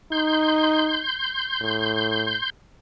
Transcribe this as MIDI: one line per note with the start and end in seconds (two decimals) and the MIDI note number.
0.12 1.04 63
0.12 2.50 84
0.12 2.50 91
1.61 2.36 45